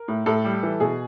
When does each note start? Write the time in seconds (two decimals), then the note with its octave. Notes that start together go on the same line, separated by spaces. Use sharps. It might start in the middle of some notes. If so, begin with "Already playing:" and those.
Already playing: A#4
0.08 A2
0.26 A2 A4
0.45 G3
0.63 E3
0.80 B2 G#4